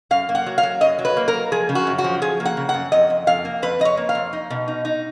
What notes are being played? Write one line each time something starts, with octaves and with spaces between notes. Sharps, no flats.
F#2 F5
A#3
F#5
F#3
F5
F#3
F#2 D#5
F#3
B4
A#3
A#4
F#3
F3 G#4
C#3
F#4
F#2
F#4
F3
F3 G#4
A#3
F#5
C#3
F#5
F#2
F2 D#5
F2
F2 F5
A#3
F2 B4
F2 D#5
C#5
A#3
F5
F2
D#4
B2
D#4
D#4